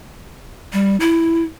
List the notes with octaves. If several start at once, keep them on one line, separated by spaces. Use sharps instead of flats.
G3
E4